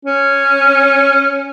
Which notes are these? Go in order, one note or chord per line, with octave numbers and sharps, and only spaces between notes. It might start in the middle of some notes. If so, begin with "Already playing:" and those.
C#4